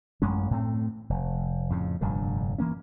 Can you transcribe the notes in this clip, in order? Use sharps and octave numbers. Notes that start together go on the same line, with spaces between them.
A1 F#2 G#3 C#4
A2 A3 C4
F1
F2 A2 C#3
F1 G2 A#2 D3
E3 A#3 C#4